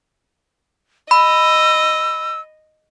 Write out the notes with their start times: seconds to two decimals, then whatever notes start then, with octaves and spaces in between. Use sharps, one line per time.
1.11 D#5 B5 E6